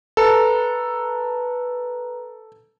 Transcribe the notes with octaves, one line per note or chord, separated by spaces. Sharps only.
A4 B4 A#5